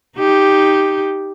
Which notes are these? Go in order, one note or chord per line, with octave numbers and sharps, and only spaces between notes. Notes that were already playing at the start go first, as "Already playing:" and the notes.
D#4 G4